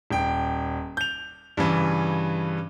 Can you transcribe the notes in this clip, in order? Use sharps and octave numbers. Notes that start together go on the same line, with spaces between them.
D#1 G5
G6 F7
G2 C#3 E3